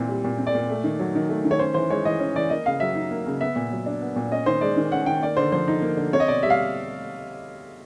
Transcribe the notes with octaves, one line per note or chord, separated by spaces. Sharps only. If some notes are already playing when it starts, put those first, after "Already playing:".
Already playing: A#2 E3 C4
G3
A#2
C4
D5
A#2
A3
D#3
F#3
D#3
A3
D#3
C#5
C#4 C5
E3 C5
G#3 C#5
E3 D#5
C#4
E3 D5
A#3 D#5
C#3 F5
F#3 E5
D#4
A#3
C#3
B3 E5
A#2
F#3
D4
B3
A#2
C#4 D#5
D#3 C5
G#3 D5
D#3
C#4 F#5
D#3 G5
A#3 D5
D3 C5
F3 C5
D#4
A#3
D3
C4 C#5
D#5
B2 D5
G3 E5
F5